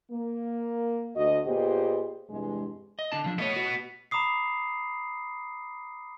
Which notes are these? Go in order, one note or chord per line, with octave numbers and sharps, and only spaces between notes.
A#3
D2 F#4 D#5
A#2 B3 G4 G#4 C5 D#5
E2 G2 C3 G#3
D#5
D3 D4 A5
D3 F3 D4
A3 B3 C#5 D#5
F#4
A#5 B5 D6 D#6 C7